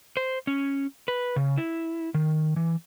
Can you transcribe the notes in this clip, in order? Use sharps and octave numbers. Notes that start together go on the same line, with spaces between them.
C5
C#4
B4
C#3
E4
D#3
E3